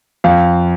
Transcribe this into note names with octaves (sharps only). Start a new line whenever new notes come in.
F2 F5